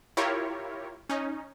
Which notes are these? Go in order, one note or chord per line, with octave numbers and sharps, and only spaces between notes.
E4 F4 G4 A#4 C#5
C#4 D#4